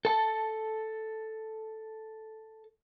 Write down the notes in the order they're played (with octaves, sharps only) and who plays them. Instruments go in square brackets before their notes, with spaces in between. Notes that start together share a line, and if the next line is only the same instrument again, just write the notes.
[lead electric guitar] A4 A5